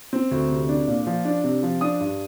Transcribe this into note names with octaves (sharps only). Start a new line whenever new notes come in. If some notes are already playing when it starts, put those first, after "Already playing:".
C4
D2
C3
D4
A#2
F3
D4
C3
F3
D4 D#6
G2